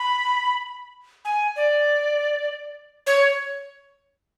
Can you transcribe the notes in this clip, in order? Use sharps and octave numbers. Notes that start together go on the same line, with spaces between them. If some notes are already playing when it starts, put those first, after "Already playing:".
Already playing: B5
G#5
D5
C#5